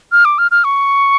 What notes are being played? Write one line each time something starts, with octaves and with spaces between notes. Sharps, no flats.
F6
D6
F6
F6
C#6